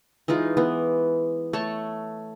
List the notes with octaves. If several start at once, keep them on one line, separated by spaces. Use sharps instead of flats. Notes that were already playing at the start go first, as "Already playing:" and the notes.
E3 G#3 D#4 F4
E3 B3
A3 C#5 A5